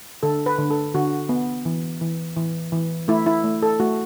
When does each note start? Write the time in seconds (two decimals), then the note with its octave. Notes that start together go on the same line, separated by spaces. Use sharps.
0.23 D3 A4
0.46 B4
0.58 D3
0.70 A4
0.94 D3 F#4
1.29 B3
1.65 E3
2.01 E3
2.36 E3
2.73 E3
3.08 A3 E4
3.26 E4
3.44 A3
3.63 A4
3.80 A3 F#4